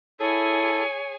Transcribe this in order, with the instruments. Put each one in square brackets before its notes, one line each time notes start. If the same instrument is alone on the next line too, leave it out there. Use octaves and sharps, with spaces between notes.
[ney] E4 [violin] G#4 G#5 [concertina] A4 [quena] C#5